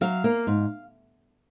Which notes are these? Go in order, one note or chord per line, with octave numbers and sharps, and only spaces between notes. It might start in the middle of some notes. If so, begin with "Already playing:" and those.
F#3 F5
A#3
G#2